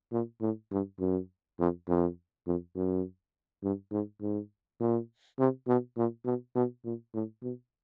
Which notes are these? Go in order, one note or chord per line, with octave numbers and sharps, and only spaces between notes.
A#2
A2
G2
F#2
F2
F2
F2
F#2
G2
G#2
G#2
A#2
C3
B2
A#2
B2
B2
A#2
A2
B2